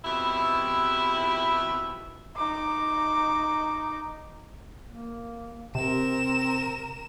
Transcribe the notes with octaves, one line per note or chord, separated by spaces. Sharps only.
F2 B2 E4 G4 E5
D#4 D6
A#3
C3 C4 A#4 E7